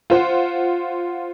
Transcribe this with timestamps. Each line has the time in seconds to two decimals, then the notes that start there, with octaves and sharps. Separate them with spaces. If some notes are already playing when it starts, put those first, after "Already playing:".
0.10 F4 C5 F#5